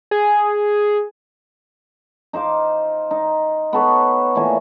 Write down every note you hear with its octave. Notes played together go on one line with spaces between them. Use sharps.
G#4
D#4 C5 F5 D6
D#4
B3 A4 C#5
A#2 E3 A3 G#5